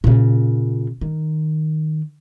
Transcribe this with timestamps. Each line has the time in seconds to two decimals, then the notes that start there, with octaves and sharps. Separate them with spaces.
0.04 A#2 C#3
1.01 D#3